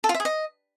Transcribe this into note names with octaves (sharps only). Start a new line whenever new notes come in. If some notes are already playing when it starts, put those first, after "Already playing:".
A4
F4
E5
G#4
D#5